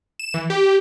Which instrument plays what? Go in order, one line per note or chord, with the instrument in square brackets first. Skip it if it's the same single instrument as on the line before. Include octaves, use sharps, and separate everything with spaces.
[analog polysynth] E7
E3
G4